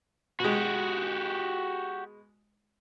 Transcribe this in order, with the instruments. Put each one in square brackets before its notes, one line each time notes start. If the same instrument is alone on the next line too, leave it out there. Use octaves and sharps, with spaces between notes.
[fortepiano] B2 G#3 [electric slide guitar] F#4 G4